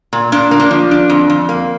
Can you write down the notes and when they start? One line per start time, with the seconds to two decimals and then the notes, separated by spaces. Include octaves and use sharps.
0.13 A#2
0.32 A#2 D4
0.51 A#3
0.60 D4
0.71 F3
0.91 D4
1.10 F2
1.30 F2
1.49 A#3